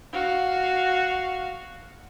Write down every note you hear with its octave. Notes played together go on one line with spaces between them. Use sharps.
F#4 F5